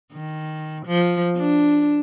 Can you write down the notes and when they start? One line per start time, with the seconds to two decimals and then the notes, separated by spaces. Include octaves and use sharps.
0.13 D#3
0.86 F3
1.36 D4